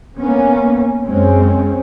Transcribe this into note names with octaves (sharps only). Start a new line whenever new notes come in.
A#3 B3 C#4
F#2 G#3 C4 C#4